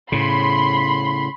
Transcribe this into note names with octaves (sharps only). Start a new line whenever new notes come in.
A2 C#3 B5 C6